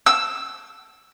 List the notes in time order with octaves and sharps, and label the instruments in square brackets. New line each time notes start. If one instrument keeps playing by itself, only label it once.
[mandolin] E6